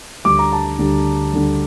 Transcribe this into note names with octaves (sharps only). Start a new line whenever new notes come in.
D2 D3 G3 D6
A#5
A5
D2 D3 G3
D2 D3 G3